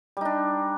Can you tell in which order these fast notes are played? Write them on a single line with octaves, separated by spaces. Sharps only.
G3 D#4 D4